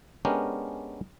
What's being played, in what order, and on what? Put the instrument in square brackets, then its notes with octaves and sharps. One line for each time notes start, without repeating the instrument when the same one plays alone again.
[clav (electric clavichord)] G#3 B3 C#4 D4 G4 A#4